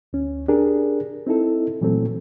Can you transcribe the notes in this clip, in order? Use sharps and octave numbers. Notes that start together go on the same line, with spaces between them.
D2 C#4
D4 G4 G#4 A#4
C4 D#4 E4 A4
A#2 E3 F#3 A3 C4 A4